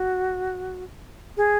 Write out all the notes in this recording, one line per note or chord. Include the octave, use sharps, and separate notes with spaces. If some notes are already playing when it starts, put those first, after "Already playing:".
Already playing: F#4
G#4